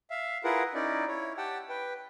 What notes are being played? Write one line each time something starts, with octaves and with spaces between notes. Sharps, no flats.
E5 F5
E4 F4 G#4 A#4 B4 F#5
C#4 D#4 E4 D5
E4 C#5
G4 F#5 G5 A5
B4 G5